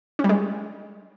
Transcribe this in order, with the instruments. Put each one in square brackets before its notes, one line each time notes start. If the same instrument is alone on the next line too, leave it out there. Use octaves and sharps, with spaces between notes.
[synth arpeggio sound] C#4
G3
G#3